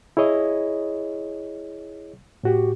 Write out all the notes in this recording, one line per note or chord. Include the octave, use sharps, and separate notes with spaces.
E4 G#4 C#5 D#5
A2 F#4 G4